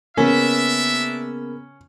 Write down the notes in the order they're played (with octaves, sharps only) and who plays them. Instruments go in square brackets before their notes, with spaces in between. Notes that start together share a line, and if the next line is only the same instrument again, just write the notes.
[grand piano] C#3 A#3 B3 [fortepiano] C#4 [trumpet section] D4 E5